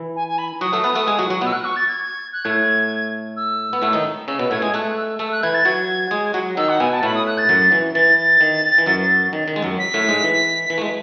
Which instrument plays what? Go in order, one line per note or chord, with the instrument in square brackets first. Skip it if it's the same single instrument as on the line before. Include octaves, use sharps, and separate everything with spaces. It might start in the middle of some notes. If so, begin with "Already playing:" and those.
Already playing: [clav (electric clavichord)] E3 E4
[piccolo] G#5
G#5
B5
[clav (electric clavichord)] F#3 F#4 [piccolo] D#6
[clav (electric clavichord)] A3 A4
B3 B4
A3 A4
G#3 G#4
F#3 F#4
F#3 F#4
[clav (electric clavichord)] B2 B3 [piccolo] E6
[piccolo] F#6
C#6
A6
G#6
F#6
[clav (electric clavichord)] A2 A3 [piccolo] G#6
[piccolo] E6
[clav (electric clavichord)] B3
A2 A3
D#3 D#4
[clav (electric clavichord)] C#3 C#4 [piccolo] E6
[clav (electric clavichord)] B2 B3 [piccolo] E6
[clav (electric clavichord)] A2 A3 [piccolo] G#6
[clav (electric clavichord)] G#3 G#4 [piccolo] G#6
[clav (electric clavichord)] A3 A4 [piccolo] F#6
[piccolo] E6
[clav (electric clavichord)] A3 A4 [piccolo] E6
[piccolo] F#6
[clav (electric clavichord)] E3 E4 [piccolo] G#6
[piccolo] A6
[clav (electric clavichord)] F#3 F#4 [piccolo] G#6
[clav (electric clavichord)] G#3 G#4
F#3 F#4
[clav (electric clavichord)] D#3 D#4 [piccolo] E6
[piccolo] F#5
[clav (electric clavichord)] B2 B3 [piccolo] G#5
[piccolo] A5
[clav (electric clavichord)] A2 A3 [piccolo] B5
[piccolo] D#6
F#6
A6
[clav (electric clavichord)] F#2 F#3
E3
[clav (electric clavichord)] E3 [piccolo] A6
[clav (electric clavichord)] D#3
E3
F#2 F#3
D#3
D#3
G#3
F#2 F#3
[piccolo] B6
[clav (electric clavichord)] A2 A3
G#2 G#3
E3
E3
A3
G#3